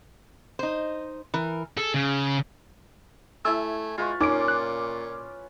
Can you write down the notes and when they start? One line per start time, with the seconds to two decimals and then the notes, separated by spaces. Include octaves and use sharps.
0.59 D#4 C5
1.34 E3 A#4
1.77 G#4 A4
1.94 C#3
3.45 A3 E4 G#5 E6
3.98 G#3 F4 B4 C#6
4.21 A#2 C#4 D#4 D6 D7
4.48 F#6